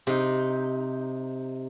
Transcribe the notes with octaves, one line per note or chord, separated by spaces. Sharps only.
C3 D#4